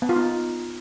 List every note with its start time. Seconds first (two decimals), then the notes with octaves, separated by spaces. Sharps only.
0.02 B3
0.09 F4
0.16 D#4